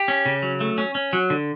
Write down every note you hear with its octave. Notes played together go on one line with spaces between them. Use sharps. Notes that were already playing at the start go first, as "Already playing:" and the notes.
Already playing: G4
C#4
C#3
F#3
A3
C#4
C#4
F#3
D3